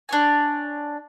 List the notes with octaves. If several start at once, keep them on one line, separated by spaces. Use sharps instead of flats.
D4 C#5 G#5